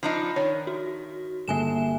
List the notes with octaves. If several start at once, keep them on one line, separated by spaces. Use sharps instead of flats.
F3 D4 D#4 B5 F6 G#6
D#3 C#5
F#4
G1 A#3 E5 G#5 E6 E7